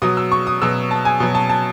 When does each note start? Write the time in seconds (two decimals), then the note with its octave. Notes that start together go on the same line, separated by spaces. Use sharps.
0.02 B2 F#3 D#6
0.17 E6
0.32 C#6
0.47 D#6
0.62 B2 F#3 E6
0.91 A5
1.05 G#5
1.20 B2 F#3
1.35 A5
1.49 A5